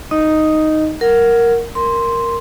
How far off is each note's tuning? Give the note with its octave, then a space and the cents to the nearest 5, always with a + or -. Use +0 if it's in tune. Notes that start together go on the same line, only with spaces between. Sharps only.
D#4 +0 D#5 +0
A#4 +0 F#5 +0
A#4 +0 C6 +0